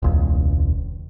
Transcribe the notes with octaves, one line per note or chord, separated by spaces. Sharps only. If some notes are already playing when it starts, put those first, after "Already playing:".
E1 C#2